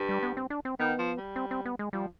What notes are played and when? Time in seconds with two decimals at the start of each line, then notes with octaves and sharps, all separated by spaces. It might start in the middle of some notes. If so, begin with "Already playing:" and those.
Already playing: G2
0.09 G3
0.23 B3
0.37 C4
0.50 D4
0.65 C4
0.80 D#3 B3
0.98 F3
1.17 G3
1.36 C4
1.51 C4
1.65 B3
1.79 G#3
1.93 F3 G3